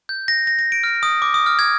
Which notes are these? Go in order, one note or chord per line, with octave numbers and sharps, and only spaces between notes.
G6
A#6
A#6
A#6
D7
F6
D#6
D6
D#6
F6
G#6